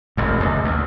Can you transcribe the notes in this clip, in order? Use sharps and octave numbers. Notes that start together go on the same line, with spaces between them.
E1 A1 E2
C#2
D2